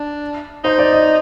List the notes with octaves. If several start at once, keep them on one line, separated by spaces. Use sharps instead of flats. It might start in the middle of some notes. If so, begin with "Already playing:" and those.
Already playing: D4
D#4 C5
D5
D#5